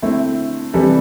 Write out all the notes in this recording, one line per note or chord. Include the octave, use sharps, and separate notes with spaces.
D3 A3 C4 E4
C3 E3 G3 D4 A4